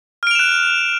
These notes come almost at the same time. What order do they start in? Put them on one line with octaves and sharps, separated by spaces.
F6 D7 F7 E7 F#6